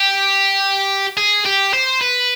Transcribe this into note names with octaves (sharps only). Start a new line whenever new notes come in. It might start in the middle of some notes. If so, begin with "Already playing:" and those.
Already playing: G4
G#4
G4
C5
B4